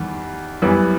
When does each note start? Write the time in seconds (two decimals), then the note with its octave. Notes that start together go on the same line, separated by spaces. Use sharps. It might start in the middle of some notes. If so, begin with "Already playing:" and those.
Already playing: E2 D#3 G3
0.62 F#2 E3 G3 B3